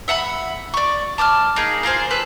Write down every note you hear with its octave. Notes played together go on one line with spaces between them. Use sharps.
E5 F#5 A5 B5
D5 C#6
A5 D6 E6 F6
A#3 D#4 G#4
A#3 F4 G#4 C5
A4 B4